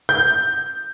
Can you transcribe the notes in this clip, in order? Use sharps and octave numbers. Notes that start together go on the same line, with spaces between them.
G6